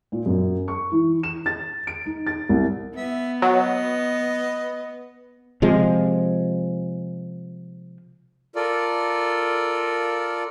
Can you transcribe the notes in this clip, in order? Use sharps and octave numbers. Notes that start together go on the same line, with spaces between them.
A#2
F#2
C#6
E3
E7
A6
D7
D#4
A6
C2
B3 E5
F#3 B4 D#5
C3 F3 G#3
F4 A4 A#4 D5